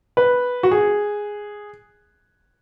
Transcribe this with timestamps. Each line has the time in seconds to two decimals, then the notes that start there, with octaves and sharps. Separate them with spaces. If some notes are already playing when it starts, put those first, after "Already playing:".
0.17 B4
0.63 F#4
0.71 G#4